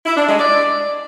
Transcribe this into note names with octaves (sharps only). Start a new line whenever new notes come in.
E4
D4
G#3
D5